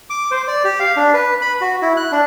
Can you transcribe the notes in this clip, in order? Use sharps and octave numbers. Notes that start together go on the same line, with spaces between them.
D6
C5
D5
G4
F5
D4
B4
B5
F#4
E4
F#6
D4